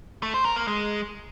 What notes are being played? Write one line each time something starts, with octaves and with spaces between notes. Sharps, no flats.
A3
C5
A#4
A#3
G#3